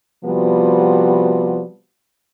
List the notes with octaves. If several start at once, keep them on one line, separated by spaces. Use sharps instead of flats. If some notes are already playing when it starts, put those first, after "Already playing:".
C3 F3 G3 B3 F#4